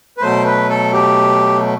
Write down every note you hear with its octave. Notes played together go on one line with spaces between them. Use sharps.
B4
B2 F#3 A3 C5
B4
A4
G4